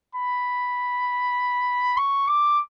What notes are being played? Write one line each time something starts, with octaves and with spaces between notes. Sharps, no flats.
B5
C#6
D6